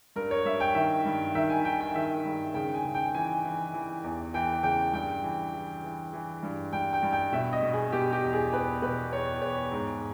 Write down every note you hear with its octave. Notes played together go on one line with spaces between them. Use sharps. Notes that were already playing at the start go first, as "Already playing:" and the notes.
G2 A#4
C#5
G2 E5
G5
D#3 E5
G2
D#3 E5
G#5
D#3 G5
G5
D#3 E5
G2
C#3 G5
G#5
C#3
G5
G5
E3 G#5
E3
E3
E2
E3 G5
C#3 G5
G2 G5
E3
E3
E3
E3
G2
G2 G5
G5
G2
G5
B2 E5
D#5
B2
G#4
B2 G4
G4
E2
G#4
E2 B4
B2 B4
E2 C#5
E2 C#5
G#2